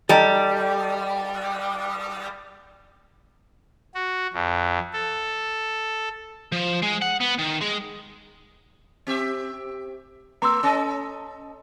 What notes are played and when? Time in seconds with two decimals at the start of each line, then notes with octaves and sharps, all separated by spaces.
0.09 G3 D#4 A4
3.95 F#4
4.33 F2
4.93 A4
6.52 F3
6.83 G#3
7.02 F#5
7.21 B3
7.39 D#3
7.61 G#3
9.07 C4 G4 E5
10.42 A3 A#5 C6 E6
10.63 C#4 A4 D#5